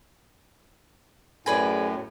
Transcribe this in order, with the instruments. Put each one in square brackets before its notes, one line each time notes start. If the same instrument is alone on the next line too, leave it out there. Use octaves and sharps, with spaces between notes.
[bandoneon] F#2 A2 [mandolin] G#4 B4 D5